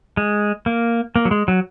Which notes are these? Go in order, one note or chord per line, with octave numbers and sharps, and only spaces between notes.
G#3
A#3
A#3
F#3
G#3
F#3